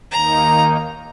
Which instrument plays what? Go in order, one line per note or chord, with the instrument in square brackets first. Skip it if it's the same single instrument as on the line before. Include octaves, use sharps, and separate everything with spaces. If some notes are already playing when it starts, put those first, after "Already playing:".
[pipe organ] D#2 D#3 A#3 D#4 [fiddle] A#5